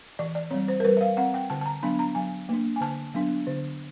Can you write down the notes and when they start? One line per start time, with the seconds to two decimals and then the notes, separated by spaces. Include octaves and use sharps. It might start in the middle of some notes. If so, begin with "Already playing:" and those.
0.19 E3 D5
0.35 D5
0.51 G3 C4 C#5
0.68 C5
0.80 A#4
0.84 G3 B4
0.97 E5
1.01 F5
1.17 C4 F#5
1.34 G5
1.50 D3 A5
1.61 A5
1.66 A#5
1.83 F#3 B3 D4 B5
1.99 A#5
2.15 F#3 G#5
2.49 A#3 D4
2.76 G#5
2.81 D3 A5
3.14 F#3 B3 D4
3.47 D3